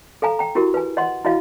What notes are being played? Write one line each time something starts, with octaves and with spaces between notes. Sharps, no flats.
A4 F5 G#5 A#5
G5 A#5
E4 F#4 G4 A#4
B4 G#5
D#5 F#5 C6
E4 F#4 D#5 F5